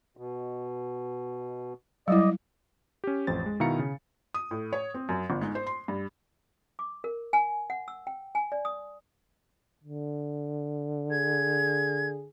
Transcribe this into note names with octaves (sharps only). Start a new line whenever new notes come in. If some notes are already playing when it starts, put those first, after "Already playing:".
B2
F#3 G3 E4 D5 D#5
C#4 G4
A1 F2 C5 A6
G#3
B2 D#3 E4 F5 A#5 C#7
C#3
D#6
A2
C#5
C4
F#2
G1
G#2
C5
C6
G2
D6
A#4
G#5
F#5
E6
G5
G#5
D5
D#6
D3
G#4 G#6